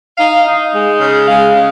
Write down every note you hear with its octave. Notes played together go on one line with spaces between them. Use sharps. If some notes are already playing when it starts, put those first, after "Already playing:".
D#4 F5
D#4
G#3
C#3
G#3 F5
C#3